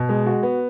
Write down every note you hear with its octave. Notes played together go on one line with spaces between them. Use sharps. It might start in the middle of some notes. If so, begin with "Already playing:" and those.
Already playing: B2
G#3
F#4
B3